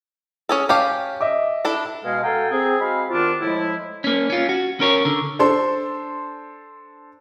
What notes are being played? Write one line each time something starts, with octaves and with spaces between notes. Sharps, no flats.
C#4 G#4 A4
C#4 G4 F5 A5
D#5 E5 D6
D4 E4 A4
B2 G#3 F5
F#4 A4 F5 G5 G#5 A#5
C4 G#4
G#3 C4 F#4 F5 B5
C3 D#3 B3 D4 F4
A2 F3 G#3 E4
A#3 C#4
C#4 F4
F#4
C#4 A#4 C#5
D3
D4 A4 C5 C6